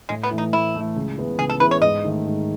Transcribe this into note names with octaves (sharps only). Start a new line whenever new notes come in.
A2 G#3
B3
E3 A3
D#4
A2 E4
E3 A3
C#2
C#3 E3 B3 E4
C#2 G#4
A4
C#3 E3 B3 E4 B4
C#5
G#2 D#5
D#3 A3 D#4
G#2